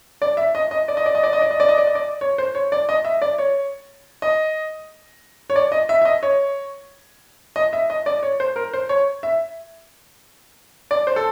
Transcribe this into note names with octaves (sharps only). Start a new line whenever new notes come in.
D5
E5
D#5
D#5
D5
D#5
D5
D#5
D5
D#5
D5
D#5
D5
D#5
D5
D#5
D5
C#5
C5
C#5
D5
D#5
E5
D5
C#5
D#5
C#5
D5
D#5
E5
E5
D#5
C#5
D#5
E5
D#5
D5
C#5
C5
A#4
C5
C#5
E5
D5
C5
A4